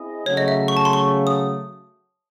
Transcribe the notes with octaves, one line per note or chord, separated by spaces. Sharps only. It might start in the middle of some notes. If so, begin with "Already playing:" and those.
Already playing: C4 E4 G#4 D#5
C#3 F#3 A3 C#5
D#5
E5
C#6
A5
C6
C#6
D#6